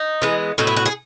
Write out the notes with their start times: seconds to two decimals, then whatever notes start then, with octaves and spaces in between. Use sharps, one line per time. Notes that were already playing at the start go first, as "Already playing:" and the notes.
Already playing: D#4
0.22 E3 G#3 B3
0.58 A2 F#3 B3 D#4
0.67 E4
0.76 F#4
0.86 G#4